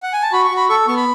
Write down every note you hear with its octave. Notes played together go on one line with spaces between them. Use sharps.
F#5
G#5
A5
F#4 B5
C#6
F#4
B5
A4 C#6
B3 C#6
B5